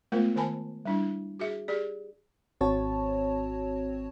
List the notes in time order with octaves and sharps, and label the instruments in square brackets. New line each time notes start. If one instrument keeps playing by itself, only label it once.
[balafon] G#3 A3 B3 F4 A#4 C5
D#3 A#4 C5 G#5 A5 B5
G3 D4 E4
F#4 G#4 E5
G4 G#4 D5
[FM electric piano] G#1 C4 F#4 C#5 A5